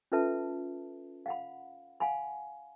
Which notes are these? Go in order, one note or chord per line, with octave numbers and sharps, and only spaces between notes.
C#4 F4 A4 B4 E5 A5
F5 F#5 B5
F5 F#5 G#5 B5